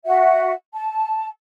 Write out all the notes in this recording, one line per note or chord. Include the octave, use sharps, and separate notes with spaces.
F#4 E5 F#5
A5